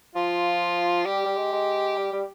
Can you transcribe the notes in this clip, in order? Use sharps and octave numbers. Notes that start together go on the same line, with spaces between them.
F3 F4
G3 G4
G3
G#3
G#3
G3
G3